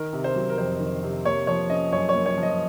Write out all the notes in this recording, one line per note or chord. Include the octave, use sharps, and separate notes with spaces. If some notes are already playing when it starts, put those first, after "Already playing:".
Already playing: D#3 A#4
C3
C5
F#3
A#4
F2 C5
D#3
C3
A#3 C#5
F3 C#5
C#4 D#5
F#2 C#5
C#5
A#3
C#5
F3
D#5